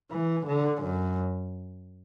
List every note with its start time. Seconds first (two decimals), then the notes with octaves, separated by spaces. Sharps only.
0.11 E3
0.47 D3
0.83 F#2